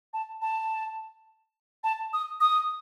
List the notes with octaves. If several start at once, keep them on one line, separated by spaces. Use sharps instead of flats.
A5
A5
A5
D#6
D#6